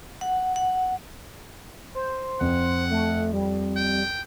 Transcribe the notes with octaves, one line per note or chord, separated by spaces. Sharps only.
F#5
F#5
C5
F2 F#5
A3
G3
G5